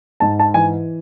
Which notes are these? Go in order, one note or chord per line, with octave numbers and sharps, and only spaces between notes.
G#2 A5
A5
E3 G#5